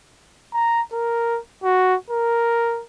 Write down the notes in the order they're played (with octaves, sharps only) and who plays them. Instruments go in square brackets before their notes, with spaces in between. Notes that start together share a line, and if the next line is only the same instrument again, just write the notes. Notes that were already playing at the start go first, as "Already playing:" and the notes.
[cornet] A#5
A#4
F#4
A#4